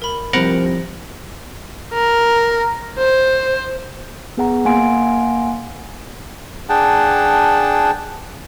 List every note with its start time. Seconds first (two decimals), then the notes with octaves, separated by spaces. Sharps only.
0.02 A#4 B5
0.33 C2 F3 C4 A#4 C5 F#5 B5
1.93 A#4
2.98 C5
4.37 B3 G#4 F#5 A#5
4.65 A#3 F5 F#5 G#5 C6 D7
6.69 D4 G#4 F#5 G5 A5